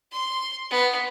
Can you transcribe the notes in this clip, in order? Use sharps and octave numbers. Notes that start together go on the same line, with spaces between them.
C6
B3